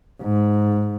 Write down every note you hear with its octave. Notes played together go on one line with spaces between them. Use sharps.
G#2